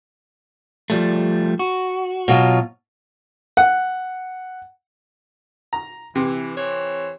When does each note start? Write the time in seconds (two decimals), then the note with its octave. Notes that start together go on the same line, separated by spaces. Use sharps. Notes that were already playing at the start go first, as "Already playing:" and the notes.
0.90 F3 G3 A3
1.59 F#4
2.28 B2 F#3 F4
3.57 F#5
5.73 A#5
6.16 C3 E3
6.56 E3 C5 C#5